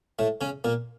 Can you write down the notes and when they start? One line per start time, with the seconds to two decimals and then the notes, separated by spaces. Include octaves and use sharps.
0.19 A2 A3
0.41 C#3 C#4
0.64 A#2 A#3